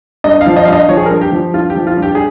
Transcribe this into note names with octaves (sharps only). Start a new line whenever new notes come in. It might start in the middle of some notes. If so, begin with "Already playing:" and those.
G2 D#5
F5
F3
D#5
G2 F5
D#5
F3 C#5
G#4
A#4
G2
G4
F3
G2 F4
G4
F3
F4
G2
G4
G#4